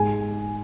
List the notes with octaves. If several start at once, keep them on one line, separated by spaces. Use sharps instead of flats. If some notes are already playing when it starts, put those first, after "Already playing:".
Already playing: G#2 G#3 G#5